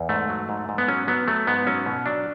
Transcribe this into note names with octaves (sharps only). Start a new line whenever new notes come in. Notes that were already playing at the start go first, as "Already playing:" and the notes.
Already playing: E2
G#2 A3
F#3
G#2
G#2
B3
F#3 C#4
F#3 B3
F#3 A3
G#2 B3
F#3 C#4
B2
F#3 D4